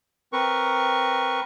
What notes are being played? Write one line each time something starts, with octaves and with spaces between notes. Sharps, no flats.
C4 A#4 B4 C#6